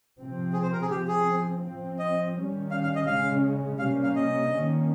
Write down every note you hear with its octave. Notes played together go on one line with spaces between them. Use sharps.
C3 F3 C4
G#4
C5
A#4
G#4
F3 C4 G4
G#4
F3 C4
D#5
D#3 G3 C#4
F5
F5
D#5
C#3 G#3 C#4 F5
C3 G3 A#3 C#4 F5
F5
D#5
D#3 A#3 C#4